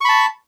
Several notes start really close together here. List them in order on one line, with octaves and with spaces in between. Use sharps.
C#6 B5 A5